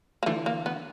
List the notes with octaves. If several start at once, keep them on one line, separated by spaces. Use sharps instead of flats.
A#3
D3 E3 A3
A#3
B3